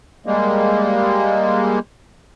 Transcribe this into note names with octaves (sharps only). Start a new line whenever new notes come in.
G3 G#3 A#3